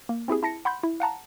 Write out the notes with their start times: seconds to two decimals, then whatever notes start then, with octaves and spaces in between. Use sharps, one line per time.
0.09 A#3
0.28 C4 E4 G4 G#4
0.43 E4 A5 A#6 C#7
0.65 F#5 B5 C6 G6
0.83 E4
1.00 F5 F#5 A5 A#5